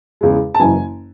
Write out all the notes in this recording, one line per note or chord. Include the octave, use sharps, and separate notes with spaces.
E2 C#3 G#3
A5
F#1 F#2 E3 G#5